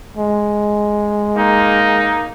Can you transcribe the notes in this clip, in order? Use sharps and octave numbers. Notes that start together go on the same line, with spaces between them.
G#3
A#3 D#4